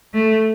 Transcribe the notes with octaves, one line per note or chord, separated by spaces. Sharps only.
A3